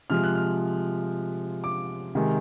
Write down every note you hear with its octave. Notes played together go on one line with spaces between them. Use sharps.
C3 F3 G#3 F6
F#6
F6
D6
C3 D#3 G#3